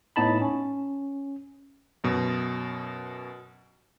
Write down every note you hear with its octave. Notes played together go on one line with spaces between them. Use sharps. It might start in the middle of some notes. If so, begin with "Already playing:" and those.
A2 B3 D#4 A5 B5
C#4
F#2 B2